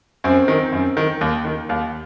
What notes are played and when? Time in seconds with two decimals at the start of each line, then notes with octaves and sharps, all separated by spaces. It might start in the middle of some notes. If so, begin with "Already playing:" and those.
0.24 F#2 C4
0.48 D#3
0.72 F#2
0.97 D#3
1.21 D#2
1.45 D#3
1.69 D#2